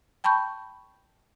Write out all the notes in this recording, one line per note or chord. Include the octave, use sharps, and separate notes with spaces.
G5 A5 B5 C#6 G6